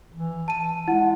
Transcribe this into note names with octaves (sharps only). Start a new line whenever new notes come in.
E3
A5 D#7
G#3 E4 F#5